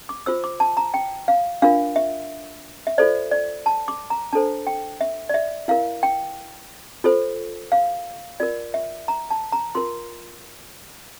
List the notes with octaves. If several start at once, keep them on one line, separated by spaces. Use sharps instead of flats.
D6
F4 C5 E6
D6
A5
A#5
G5
F5
D4 F4 A#4 F5
E5
E5
F4 A4 C5 D5
D5
A5
D6
A#5
D4 A4 C5 A5
G5
E5
D5
E5
E4 A#4 F5
G5
F4 A4 C5
F5
F4 A#4 D5
E5
A#5
A5
A#5
F4 A#4 C6